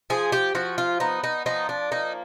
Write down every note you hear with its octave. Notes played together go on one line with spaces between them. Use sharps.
F3 G#4
G4
F3 F#4
F4
B3 D#4
D#4
F3 D#4
D4
A#3 D#4